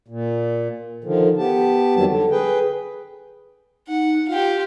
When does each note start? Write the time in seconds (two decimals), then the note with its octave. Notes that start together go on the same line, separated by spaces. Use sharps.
0.08 A#2
1.04 D3 D#3 F3
1.38 B3 G4 A5
1.96 F2 D#3 F#3 G3 A5
2.08 D3
2.32 G#4 B4 G5
3.88 D#4 F#5
4.28 F4 G4 F5